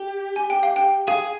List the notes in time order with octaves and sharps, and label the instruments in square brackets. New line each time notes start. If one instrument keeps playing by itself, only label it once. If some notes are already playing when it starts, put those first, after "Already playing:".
Already playing: [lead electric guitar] G4
[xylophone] G#5
G5
F5
G5
[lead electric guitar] G#4 [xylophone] F5